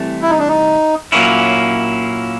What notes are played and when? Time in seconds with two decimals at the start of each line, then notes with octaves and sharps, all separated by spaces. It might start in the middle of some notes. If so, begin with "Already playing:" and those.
Already playing: C2 C3 E3 A3
0.22 E4
0.30 D#4
0.39 D4
0.48 D#4
1.12 A#2 F#3 A#3 C#4 E4